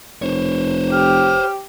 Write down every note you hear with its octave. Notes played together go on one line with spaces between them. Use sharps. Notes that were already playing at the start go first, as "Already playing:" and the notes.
F1 C5 C#5
G4 F6